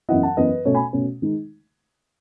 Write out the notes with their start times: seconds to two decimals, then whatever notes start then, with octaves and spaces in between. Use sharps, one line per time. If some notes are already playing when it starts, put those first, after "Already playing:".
0.09 F#2 E3 B3 E4 D#5 F#5
0.23 F#5 A5
0.37 F#2 E3 B3 E4 B4 D#5
0.65 B2 A3 C#4 A4 C#5
0.75 G#5 B5
0.93 B2 A3 C#4
1.22 D#3 G#3 D#4